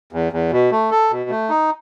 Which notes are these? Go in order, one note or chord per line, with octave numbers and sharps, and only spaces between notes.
E2
E2
B2
A3
A4
B2
A3
D#4